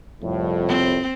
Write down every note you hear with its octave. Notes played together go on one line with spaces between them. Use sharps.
C2 F2 A2
C4